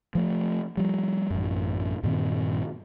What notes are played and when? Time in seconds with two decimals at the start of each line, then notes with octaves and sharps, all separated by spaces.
0.15 F3 A3
0.77 F3 G3
1.30 A1 F#2
2.03 G2 A#2 D#3 C4